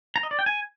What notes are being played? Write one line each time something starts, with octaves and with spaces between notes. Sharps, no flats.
A#5
D#5
D5
G5
G#5